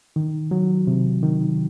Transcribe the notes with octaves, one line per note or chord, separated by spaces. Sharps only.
D#3
F#3
C3
D#3